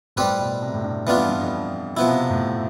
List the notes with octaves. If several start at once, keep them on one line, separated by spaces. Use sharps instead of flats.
A2 G3 C4 G4 B4
B2
C3
A2
G2
F2 E3 B3 D4 F4
G2
G2
F2
B2 F3 B3 E4
C3
A2